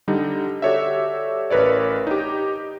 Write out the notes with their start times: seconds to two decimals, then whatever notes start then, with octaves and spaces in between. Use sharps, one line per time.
0.08 D3 G3 D#4
0.62 F#4 G4 A4 C#5 D5 E5
1.50 A1 A#4 B4 C#5 D5
2.07 D#4 G4